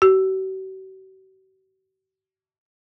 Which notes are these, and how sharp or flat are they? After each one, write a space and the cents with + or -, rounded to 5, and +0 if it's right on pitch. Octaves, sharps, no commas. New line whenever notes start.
F#4 +45